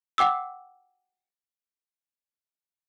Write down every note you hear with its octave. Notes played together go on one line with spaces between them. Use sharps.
F#5 G5 D6 E6